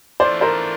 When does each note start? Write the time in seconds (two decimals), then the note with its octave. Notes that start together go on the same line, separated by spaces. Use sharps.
0.20 E3 A3 D4 F4 C5 D5
0.41 A#4 C5